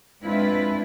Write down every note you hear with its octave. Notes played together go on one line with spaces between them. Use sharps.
G#3 C4 D4 E4 F4 B4